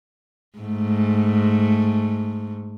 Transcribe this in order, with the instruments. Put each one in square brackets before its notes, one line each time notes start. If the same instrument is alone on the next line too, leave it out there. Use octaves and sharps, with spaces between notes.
[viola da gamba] G#2 A3